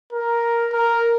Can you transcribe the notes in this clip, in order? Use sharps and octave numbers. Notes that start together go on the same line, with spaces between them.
A#4
A#4